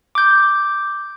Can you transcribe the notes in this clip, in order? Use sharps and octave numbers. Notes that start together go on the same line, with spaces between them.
D6 G6